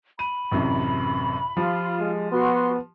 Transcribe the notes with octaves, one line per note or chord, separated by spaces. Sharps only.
B5 D#7
A1 F#2 C3
F3 F4 G4
G#3
B3 F#4 C6